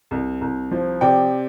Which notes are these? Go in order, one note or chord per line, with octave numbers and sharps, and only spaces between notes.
C2
C2
F3
C3 D5 G5